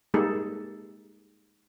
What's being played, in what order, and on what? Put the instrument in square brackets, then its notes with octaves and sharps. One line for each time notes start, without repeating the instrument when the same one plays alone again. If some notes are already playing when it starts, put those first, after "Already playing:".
[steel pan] G3 G#3 A#3 D#4 G#4 A4